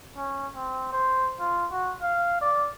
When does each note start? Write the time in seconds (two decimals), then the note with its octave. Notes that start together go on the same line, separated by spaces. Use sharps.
0.16 C#4
0.55 C4
0.92 C5
1.40 F4
1.72 F#4
2.02 F5
2.41 D5